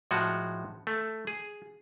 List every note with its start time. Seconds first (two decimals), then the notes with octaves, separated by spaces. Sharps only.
0.11 A2 F3 G#3 F#4
0.87 A3
1.27 G#4